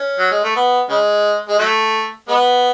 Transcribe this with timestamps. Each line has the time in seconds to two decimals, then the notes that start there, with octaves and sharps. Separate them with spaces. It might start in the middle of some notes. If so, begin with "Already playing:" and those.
Already playing: C#4
0.19 F#3
0.31 G#3
0.43 A3
0.55 B3
0.89 C#3 G#3
1.48 G#3
1.59 F#3 A3
2.28 G#3 B3